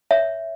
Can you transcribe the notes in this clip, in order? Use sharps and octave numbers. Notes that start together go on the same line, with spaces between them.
C#5 E5